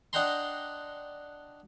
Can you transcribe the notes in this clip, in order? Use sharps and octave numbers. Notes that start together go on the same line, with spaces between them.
D4 D#5 F#5 G5 A#5 C6